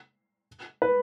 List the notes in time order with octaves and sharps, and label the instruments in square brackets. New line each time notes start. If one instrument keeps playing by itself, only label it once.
[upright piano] B4